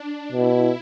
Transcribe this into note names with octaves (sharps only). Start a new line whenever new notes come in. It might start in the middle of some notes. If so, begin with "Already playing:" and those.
Already playing: D4
B2 E4